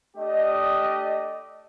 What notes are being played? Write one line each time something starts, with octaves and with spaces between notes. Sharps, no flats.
A3 D4 G4 D5 D#5